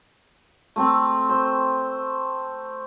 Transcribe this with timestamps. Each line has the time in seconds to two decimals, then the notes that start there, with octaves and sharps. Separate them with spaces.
0.76 A3 C4
1.29 C5